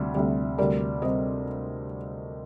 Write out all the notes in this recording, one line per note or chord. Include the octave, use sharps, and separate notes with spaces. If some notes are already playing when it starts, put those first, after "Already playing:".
Already playing: D2 C3 G3
D2 C3 G3
D2 C3 G3 A#4 D5
C3 G3 C5 D#5